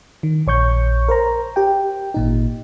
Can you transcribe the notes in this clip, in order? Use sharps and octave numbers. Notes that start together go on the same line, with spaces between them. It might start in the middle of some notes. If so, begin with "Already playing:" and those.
D#3
A#1 C#5 C#6 G6
A#4 C5 A#5
G4 G5
G#1 A#2 D#4